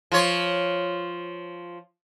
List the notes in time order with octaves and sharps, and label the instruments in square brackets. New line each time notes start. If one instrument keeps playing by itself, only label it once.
[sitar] F3 F4 C#5